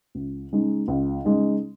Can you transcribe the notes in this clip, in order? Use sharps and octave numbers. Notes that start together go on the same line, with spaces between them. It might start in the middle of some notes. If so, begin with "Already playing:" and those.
C#2
C#3 G#3 D#4
C#2
C#3 G#3 D#4